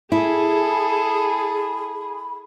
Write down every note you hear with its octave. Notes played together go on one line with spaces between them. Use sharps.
E4 G#4 A4 B5